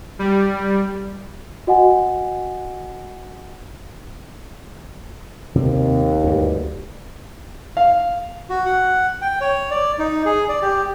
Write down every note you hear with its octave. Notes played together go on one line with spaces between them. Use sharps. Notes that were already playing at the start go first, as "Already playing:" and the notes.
G3
F#4 D#5 F#5 G#5
D#2 C3 C4
D2 G2
F5
F#4
F#5
G5
C#5
D5
D#4
G#4
D5
G4